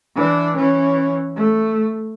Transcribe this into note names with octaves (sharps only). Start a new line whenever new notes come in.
E3 D4
E3 C#4
A3